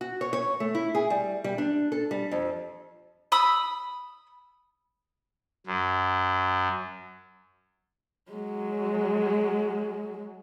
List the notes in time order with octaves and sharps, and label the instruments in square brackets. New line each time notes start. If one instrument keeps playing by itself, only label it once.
[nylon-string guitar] F#4
C#5
C#5
A3
E4
G#4
G3
G3
D4
A4
G3
F2
[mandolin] B5 D#6 E6
[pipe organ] F#2
[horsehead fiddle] F#3 G#3